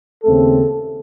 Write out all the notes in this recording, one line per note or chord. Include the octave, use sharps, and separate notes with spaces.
D#2 C#3 A3 C4 A4